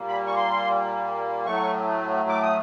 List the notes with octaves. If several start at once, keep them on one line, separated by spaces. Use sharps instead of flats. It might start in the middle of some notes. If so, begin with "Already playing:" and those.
Already playing: A#2 G3 A#3
B5
C#6
C6
A2 F#3 A3 C#6
D6
D#6